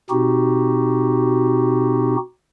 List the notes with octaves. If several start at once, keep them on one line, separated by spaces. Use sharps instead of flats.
B2 C4 D#4 F#4 G4